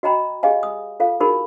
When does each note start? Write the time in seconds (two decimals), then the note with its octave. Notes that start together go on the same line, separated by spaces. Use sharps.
0.03 F#4 D#5 G5 A#5 B5
0.43 G4 G#4 D#5 F5 G#5
0.63 D#6
1.00 F4 A4 F5
1.20 D#4 E4 F#4 G#4 A#4 B5